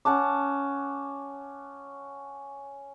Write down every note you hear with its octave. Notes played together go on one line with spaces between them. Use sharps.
C#4 F#5 A5 D6